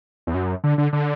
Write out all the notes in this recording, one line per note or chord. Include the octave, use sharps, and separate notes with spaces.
E2
F#2
D3
D3
D3